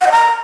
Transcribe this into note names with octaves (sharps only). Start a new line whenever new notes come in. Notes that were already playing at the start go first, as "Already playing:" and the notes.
F#5
D#5
A#5